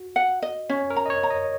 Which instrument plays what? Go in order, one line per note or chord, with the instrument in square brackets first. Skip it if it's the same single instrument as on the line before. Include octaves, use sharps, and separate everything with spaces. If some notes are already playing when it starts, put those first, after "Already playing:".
Already playing: [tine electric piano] F#4
[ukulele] F#5
D#5
[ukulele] C#4 [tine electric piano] C#5
[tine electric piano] A#4
[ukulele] A#5
[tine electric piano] D#5
C#5
[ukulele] A#5
[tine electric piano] D#5